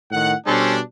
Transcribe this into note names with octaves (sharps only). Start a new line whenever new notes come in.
A2 D#3 F#5
B2 G3 C#4 D4 A4 C5